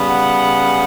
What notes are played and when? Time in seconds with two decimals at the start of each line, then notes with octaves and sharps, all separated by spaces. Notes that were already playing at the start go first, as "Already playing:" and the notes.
Already playing: C#3 G3 B3
0.08 F#5